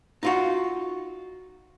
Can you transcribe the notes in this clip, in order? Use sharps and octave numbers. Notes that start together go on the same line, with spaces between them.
D#4 F4 F#4